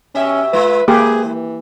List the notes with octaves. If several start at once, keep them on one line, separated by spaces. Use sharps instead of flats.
B2 C#4 G4 E5
G#3 F4 B4
G#3 A#3 G4 G#4 B4
E3